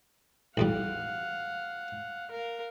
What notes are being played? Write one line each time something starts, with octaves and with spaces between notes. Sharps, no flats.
B1 E2 G3 F5 F#5
A#4 F5